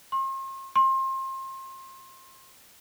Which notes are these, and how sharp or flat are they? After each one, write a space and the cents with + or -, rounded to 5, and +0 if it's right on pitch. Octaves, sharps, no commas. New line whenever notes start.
C6 +45
C6 +30